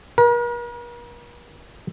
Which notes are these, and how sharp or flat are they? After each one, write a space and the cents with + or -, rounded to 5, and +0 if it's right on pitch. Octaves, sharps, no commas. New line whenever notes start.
A#4 +45